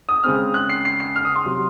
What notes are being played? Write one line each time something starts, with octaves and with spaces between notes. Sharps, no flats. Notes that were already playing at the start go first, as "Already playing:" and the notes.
D#6
C#3 G#3 C4 F6
F#6
C7
C7
C7
F6
D#6
C6
C3 F#3